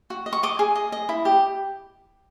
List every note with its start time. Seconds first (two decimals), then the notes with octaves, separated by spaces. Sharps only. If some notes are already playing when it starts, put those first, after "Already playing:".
0.10 F#4
0.26 D#5
0.33 C#6
0.43 D#5 D6
0.59 G#4
0.75 D#5
0.92 D#5
1.09 E4
1.25 G4